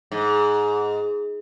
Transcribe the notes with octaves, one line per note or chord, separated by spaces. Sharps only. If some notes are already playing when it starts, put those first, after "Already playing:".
G#2